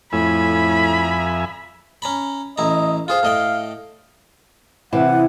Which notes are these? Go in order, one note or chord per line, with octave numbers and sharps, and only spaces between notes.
F2 A2 E5 G#5 B5
C#4 A#5 B5
A1 E4 D#5 A#5
F4 G#4 C5 F5
A2 D#5 G5
C3 E3 E4 F#5